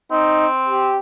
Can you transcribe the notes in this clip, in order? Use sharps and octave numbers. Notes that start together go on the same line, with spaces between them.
C4 D#4
G4